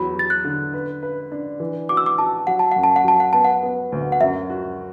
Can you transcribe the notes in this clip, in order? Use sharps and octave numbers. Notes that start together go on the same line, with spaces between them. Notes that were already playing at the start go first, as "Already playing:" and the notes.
Already playing: E2 F#3 B5
F#3 A6
F#6
D3
B4
B4
D4
E3
F#4 D6
E6
D6
F#4 A5
F#3 F#5
A5
F#2 F#5
A5
F#5
F#3 A5
F#5
B3 A5
F#5
B3
D2
F#5
F#2 E5
F#4